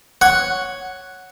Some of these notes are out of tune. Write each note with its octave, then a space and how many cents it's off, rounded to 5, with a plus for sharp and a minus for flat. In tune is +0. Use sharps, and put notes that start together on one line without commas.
C#5 +0 F#5 +0 C#6 +0